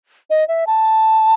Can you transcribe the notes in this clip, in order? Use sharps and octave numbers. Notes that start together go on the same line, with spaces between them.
D#5
E5
A5